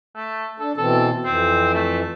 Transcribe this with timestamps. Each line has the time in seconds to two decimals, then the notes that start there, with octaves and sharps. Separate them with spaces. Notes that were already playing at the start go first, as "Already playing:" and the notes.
0.15 A3
0.59 D4 A4
0.77 B2 E3 C4 A4
1.25 F2 E3 C4
1.74 A3